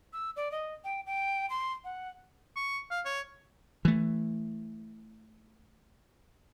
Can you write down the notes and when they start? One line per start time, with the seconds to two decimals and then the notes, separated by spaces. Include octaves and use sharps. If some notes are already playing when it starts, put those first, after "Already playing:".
0.13 E6
0.36 D5
0.52 D#5
0.84 G5
1.06 G5
1.50 C6
1.84 F#5
2.56 C#6
2.91 F5
3.05 C#5
3.85 E3 A3